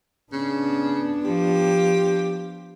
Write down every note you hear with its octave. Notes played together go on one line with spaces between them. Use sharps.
C#3 B3 D4
F3 G4